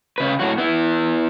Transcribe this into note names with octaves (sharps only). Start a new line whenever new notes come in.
C#3 B4
A2 F#3 F#4
B3 E4